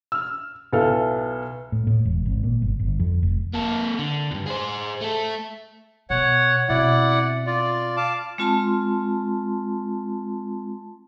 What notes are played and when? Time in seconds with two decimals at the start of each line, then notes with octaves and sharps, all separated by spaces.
0.12 E6 F6
0.73 B1 B3 E4 A4 F5 F6
1.72 A2
1.87 A2
2.05 E1
2.26 G#1
2.43 A#2
2.62 G1
2.79 G1
3.00 F2
3.23 F1
3.54 A#3 A4
3.99 D3
4.31 E2 G2
4.46 G#4 C5
5.01 A3 A4
6.10 B2 C#5 F#5
6.69 B2 C4 E4 D5 F#5
7.46 F4 D5
7.97 F5 A5 D6
8.38 G#3 C4 F4 A5 C6